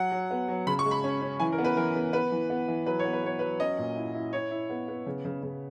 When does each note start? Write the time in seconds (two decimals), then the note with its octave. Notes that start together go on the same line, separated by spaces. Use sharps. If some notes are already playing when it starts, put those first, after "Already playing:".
Already playing: F#3 F#5
0.12 F#3
0.31 B3
0.48 F#3
0.67 C#3 B5
0.79 C#6
0.85 G#3
0.91 B5
1.04 C#4
1.22 C#4
1.40 E3 G#5
1.52 A#4
1.58 B3
1.64 B4
1.77 E3 A#4
1.95 B3
2.13 B3 B4
2.32 E3
2.50 B3
2.68 E3
2.86 F#3 B4
2.99 C#5
3.05 B3
3.13 B4
3.23 B3 C#5
3.39 F#3 B4
3.60 C#4 D#5
3.78 A#2
3.96 E4
4.15 E4
4.33 E4 C#5
4.51 E4
4.70 B3
4.88 B3
5.06 C#3
5.25 C#3
5.43 C#3